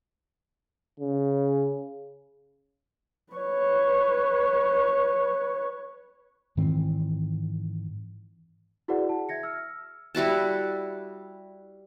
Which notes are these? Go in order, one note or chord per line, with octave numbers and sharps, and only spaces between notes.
C#3
B4 C#5
G#2 D#3 E3 C4
E4 F#4 G#4 B4 D5 F#5
A5
E5 G#6 A#6 C#7
E6 F6
G3 E4 F#4 A5